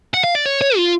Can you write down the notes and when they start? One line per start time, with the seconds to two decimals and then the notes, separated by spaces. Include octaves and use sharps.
0.14 F#5
0.24 F5
0.35 D5
0.46 C#5
0.61 C#5
0.77 F4